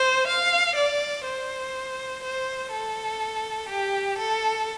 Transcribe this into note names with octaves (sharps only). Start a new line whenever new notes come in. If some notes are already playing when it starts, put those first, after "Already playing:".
Already playing: C5
F5
D5
C5
C5
A4
G4
A4